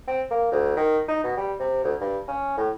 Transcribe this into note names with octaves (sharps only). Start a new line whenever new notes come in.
C4
A#3
D2
D#3
D#4
B2
G3
C3
D2
G2
C#4
A2